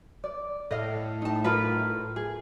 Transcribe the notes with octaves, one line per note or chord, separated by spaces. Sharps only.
D5
A2 D#5 F5
D#4 A5
F4 A#4 B4
G#4